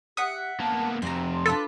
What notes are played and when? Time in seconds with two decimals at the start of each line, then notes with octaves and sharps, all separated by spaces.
0.17 G4 E5 F#5 D#6
0.60 A#3 B3 A5
1.02 F2 C3 F#4 C5 A#5
1.32 C6
1.46 D4 F4 A4 B4